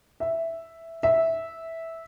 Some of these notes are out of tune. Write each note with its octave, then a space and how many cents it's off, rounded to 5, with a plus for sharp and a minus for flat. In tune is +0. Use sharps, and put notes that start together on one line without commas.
E5 +0
E5 -10